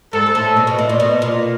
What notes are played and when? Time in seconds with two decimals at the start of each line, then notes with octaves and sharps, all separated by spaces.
0.13 G#2 A4
0.26 G#2
0.35 A2
0.56 B2
0.67 B2
0.78 A2
0.89 A#2
1.00 B2
1.22 A#2